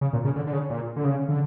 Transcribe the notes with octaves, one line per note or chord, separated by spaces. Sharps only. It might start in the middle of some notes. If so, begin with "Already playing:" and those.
C#3
A#2
C#3
D3
D3
C#3
A#2
D3
C#3
D3